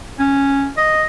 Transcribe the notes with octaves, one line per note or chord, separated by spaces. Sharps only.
C#4
D#5